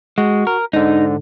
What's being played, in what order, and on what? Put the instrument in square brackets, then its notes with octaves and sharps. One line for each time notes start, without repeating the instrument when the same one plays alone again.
[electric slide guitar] G#3 [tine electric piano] F#4
[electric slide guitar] A#4
[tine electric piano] G#2 D3 [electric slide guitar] D#4